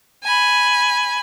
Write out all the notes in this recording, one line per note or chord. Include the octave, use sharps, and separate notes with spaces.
G#5 B5